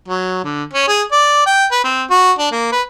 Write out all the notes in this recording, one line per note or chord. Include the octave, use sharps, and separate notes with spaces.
F#3
D3
C#4
G#4
D5
G5
B4
C4
F#4
D4
A#3
B4